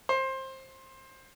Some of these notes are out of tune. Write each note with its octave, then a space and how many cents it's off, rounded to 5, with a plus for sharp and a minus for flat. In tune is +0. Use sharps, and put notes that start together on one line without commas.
C5 +20